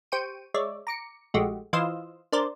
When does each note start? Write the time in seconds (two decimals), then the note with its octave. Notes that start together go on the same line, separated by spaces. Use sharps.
0.12 G4 C5 G5 C#6 D7 D#7
0.54 G#3 C#5 D5 E5
0.87 A#5 D6 C#7
1.34 A#1 G#3 A3 F#4 G4
1.73 E3 F4 C5 D#5 F5 E6
2.32 D4 A#4 C5 D5